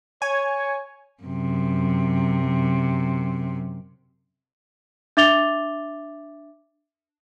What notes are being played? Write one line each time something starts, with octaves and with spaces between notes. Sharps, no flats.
C#5 G#5
F#2 C3
D4 E5 D6 A6 F7 G7